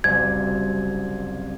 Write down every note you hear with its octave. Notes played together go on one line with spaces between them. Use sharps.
F#1 C2 G#6